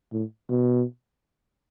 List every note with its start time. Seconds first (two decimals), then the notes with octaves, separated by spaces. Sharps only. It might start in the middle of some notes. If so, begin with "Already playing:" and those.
0.12 A2
0.50 B2